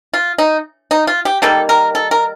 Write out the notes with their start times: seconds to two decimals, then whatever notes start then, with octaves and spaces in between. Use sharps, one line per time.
0.14 F4
0.38 D#4
0.91 D#4
1.07 F4
1.25 G4
1.42 D#3 G3 A#3 A4
1.69 A#4
1.95 A4
2.11 A#4